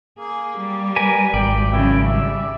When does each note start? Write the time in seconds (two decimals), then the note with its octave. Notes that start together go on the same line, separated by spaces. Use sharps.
0.19 A#3 G#4
0.58 G3
0.96 A#4 B4 G#5
1.34 G#1 D5 G5
1.73 C#3 F#3 E4
2.07 G3 E5